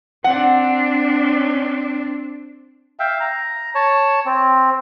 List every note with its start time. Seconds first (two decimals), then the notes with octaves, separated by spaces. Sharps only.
0.24 C4 D4 F#5
2.99 E5 F5 G5
3.20 A#5
3.75 C#5 A5
4.26 C4